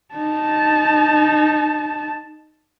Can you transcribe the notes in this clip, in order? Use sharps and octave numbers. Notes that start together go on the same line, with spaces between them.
D#4 A5